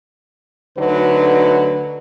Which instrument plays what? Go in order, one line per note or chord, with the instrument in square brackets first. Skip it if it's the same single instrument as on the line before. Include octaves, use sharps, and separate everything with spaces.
[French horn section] D2 D3 F#3 D#4 B4